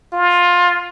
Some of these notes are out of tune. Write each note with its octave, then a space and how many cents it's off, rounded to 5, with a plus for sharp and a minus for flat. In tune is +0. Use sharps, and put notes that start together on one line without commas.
F4 +20